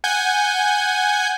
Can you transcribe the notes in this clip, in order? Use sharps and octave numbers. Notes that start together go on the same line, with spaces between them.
F#5 G#5 G6